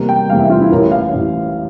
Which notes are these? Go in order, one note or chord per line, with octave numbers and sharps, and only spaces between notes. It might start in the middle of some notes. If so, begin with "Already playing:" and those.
Already playing: E2 C3 G3 A#3
G5
E2 C3 G3 A#3 F5
E5
F4
E4
A1 A2 E3 A#4
F5
A1 A2 E3